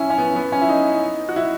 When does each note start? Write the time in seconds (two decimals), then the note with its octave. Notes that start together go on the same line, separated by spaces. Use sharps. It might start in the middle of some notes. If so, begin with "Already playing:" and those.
Already playing: C#4 E4
0.10 C#4
0.18 B3
0.36 B3
0.52 C#4
0.62 E4
0.69 D#4
1.29 F#4
1.36 E4